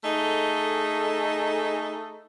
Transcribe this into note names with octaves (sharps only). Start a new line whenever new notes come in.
A3 D#4 G#4 A4